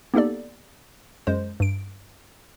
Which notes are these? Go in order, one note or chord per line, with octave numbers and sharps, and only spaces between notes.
A#3 B3 D#4 G4 A4 D5
F#2 G#3 C5
G2 D7